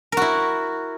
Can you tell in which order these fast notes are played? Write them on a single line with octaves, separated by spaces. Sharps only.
A#4 F#4 E4